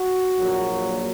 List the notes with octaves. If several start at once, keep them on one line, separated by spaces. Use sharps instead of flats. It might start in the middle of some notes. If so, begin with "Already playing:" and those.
Already playing: F#4
A#1 A#2 F#3